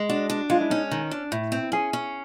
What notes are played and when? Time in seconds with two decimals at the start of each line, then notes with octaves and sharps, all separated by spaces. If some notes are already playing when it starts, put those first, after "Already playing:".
Already playing: G#3
0.09 D4 F#4
0.30 D4
0.50 G#3 F4
0.61 E4
0.70 C#4 D#4
0.91 D#3
1.11 D4
1.32 A2
1.52 C4
1.72 C#4 G#4
1.93 C#4